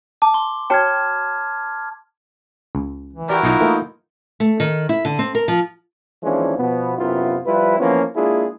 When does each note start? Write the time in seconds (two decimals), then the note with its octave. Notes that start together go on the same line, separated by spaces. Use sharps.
0.22 A5 D6
0.34 C6
0.70 F#4 C#5 G5 A5 F6 G#6
2.75 C#2
3.13 E3
3.29 E4 F#4 G4 A#4 D5
3.43 B1 D#4 F4
3.61 E3 A3 A#3
4.40 A3
4.60 D#3
4.89 E4
5.05 D3
5.19 C4
5.35 A#4
5.48 F3
6.23 D#2 E3 F3 G#3 C#4 D4
6.58 B2 F3 B3
6.97 F#2 C3 B3 E4 F4
7.45 F3 G3 E4 F4 B4
7.78 E3 F3 A#3 B3 C#4 F4
8.16 G#3 A#3 D4 E4 F4 G#4